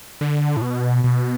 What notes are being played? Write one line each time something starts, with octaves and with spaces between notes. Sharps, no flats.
D3
A2
B2
B2